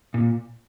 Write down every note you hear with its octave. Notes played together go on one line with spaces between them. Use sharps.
A#2